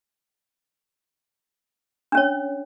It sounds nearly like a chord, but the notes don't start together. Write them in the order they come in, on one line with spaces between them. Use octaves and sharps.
D4 C#4 C#5